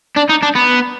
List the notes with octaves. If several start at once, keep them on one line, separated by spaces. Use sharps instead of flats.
D4
D#4
D4
B3